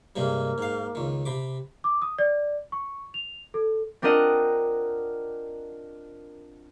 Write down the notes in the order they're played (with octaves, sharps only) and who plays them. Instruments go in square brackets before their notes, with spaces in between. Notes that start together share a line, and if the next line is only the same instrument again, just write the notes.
[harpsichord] G2 C3 G#3 [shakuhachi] A#3
[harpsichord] G#2 F5
C#2 D#3
C3 B5 D6
[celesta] D6
D#6
D5
C#6
F7
A4
[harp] C4 D4 F4 A#4 D#5 F#5